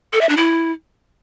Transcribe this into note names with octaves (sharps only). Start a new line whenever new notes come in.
A4
E5
D4
E4